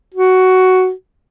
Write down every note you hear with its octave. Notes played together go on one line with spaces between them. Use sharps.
F#4